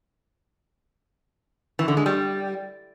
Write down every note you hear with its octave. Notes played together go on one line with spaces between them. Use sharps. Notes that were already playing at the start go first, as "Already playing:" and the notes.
E3
D3
G#3
G3